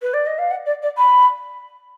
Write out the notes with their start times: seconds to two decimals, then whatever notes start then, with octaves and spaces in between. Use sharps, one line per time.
0.01 B4
0.13 D5
0.26 D#5
0.38 F5
0.50 F#5
0.65 D5
0.82 D5
0.97 B5